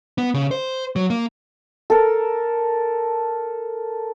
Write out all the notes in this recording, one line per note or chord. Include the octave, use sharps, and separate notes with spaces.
B3
C#3
C5
F#3
A#3
A4 A#4